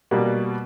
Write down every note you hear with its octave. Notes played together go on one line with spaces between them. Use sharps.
B2 G3 A#3